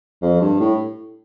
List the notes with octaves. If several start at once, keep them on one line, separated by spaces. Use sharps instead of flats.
F2
G2
A2